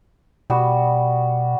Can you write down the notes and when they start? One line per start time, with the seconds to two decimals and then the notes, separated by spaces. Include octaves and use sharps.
0.50 B2 G3 B3 F#4